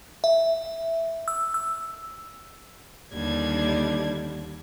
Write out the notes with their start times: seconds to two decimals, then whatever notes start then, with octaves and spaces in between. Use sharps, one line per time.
0.24 E5
1.28 E6
1.54 E6
3.13 D#2 D3 G3 D4 G#6